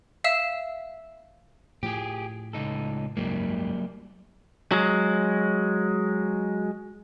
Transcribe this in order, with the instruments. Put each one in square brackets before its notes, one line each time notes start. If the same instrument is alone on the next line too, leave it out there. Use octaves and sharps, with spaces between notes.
[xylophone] E5 F5 E6 E7
[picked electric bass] A2 F3 [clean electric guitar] G4 G#4
[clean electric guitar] C#2 D#4 A4
[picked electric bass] F#1 C#2 G#2 [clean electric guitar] F#3 G3 A#3
[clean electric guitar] F#3 G#3